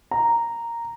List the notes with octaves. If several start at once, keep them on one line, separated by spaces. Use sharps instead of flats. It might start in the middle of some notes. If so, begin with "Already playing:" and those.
A#5